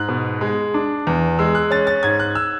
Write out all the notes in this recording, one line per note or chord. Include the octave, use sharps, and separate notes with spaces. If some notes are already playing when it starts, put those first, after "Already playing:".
Already playing: G#2 F#6
B2
G#3
D4
E2
G#3 E6
F#6
C#4 A6
A6
G#2 G#6
F#6
E6